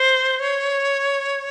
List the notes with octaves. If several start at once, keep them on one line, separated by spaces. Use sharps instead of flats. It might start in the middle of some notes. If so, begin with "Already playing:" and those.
Already playing: C5
C#5